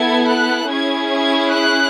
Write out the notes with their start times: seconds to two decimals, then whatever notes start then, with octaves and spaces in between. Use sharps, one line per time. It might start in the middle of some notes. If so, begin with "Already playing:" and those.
Already playing: B3 E4 A4 G#6
0.29 F#6
0.70 C#4 E4 G#4 G#6
1.10 G#6
1.51 F#6